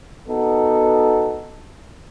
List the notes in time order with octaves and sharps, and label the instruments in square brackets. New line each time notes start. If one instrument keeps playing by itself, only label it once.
[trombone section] B3 D#4 F#4 A4